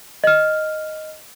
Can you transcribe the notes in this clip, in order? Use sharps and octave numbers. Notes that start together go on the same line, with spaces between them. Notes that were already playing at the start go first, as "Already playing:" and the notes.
D#5 F6